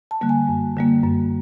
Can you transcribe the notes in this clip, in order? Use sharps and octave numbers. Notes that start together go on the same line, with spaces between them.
A5
D3 G3 A#3
G#5
F#2
D3 G3 A#3
F#2